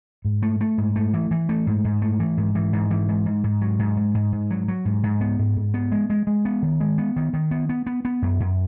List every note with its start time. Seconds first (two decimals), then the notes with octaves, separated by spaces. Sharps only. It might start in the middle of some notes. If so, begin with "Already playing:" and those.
0.25 G#2
0.43 A3
0.61 A3
0.78 G#2
0.96 A3
1.14 E3
1.31 E3
1.49 A3
1.67 G#2
1.84 G#2
2.02 A3
2.20 E3
2.37 G#2
2.55 E3
2.73 G#2
2.91 E3
3.09 G#2
3.26 G#2
3.44 G#2
3.61 F#3
3.79 G#2
3.97 G#2
4.15 G#2
4.32 G#2
4.51 F#3
4.68 F#3
4.85 G#2
5.03 G#2
5.21 B3
5.39 G#2
5.57 G#2
5.74 B3
5.92 G#3
6.10 G#3
6.27 G#3
6.45 B3
6.62 D#3
6.80 G#3
6.98 B3
7.16 D#3
7.33 D#3
7.51 B3
7.69 B3
7.86 B3
8.05 B3
8.22 F#2
8.40 F#2